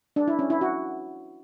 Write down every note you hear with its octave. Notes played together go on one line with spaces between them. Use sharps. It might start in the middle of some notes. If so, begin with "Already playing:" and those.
D4
E4
C#4
E4
F#4